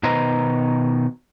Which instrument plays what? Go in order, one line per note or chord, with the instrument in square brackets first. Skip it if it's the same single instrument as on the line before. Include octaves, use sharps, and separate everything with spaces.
[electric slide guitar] B2 D#3 B4 C5 D#5 A#5